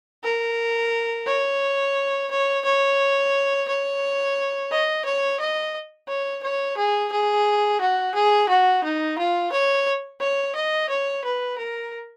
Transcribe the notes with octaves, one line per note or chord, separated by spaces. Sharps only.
A#4
C#5
C#5
C#5
C#5
D#5
C#5
D#5
C#5
C#5
G#4
G#4
F#4
G#4
F#4
D#4
F4
C#5
C#5
D#5
C#5
B4
A#4